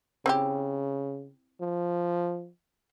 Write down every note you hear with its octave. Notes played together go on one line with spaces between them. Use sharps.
C#3 C4 E4 G4
F3